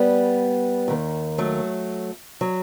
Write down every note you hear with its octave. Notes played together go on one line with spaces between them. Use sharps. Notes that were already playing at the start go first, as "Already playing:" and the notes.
Already playing: G3 B3
D#2 D#3
F#3 A3
F#3